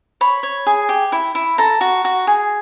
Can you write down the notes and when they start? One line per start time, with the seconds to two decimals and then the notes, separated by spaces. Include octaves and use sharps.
0.21 C#5 B5
0.43 C#5
0.67 G#4
0.89 G4
1.12 E4
1.35 E4
1.58 A4 A#5
1.81 F#4
2.05 F#4
2.27 G#4